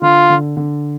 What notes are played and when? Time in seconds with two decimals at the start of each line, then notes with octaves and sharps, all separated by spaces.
0.02 D3 F4
0.30 D3
0.57 D3